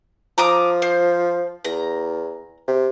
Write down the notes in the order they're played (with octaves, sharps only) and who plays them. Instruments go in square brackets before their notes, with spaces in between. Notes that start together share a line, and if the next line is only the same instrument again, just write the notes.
[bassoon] F3 [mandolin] A#5 D6 D#6
[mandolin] C5
[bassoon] E2 [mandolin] A#5
[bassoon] C3